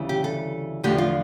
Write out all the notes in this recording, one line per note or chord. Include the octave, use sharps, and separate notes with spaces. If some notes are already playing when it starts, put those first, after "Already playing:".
Already playing: D2 C#3 E3 G3
G4
A4
E2 D3 F3 A3 G4
F4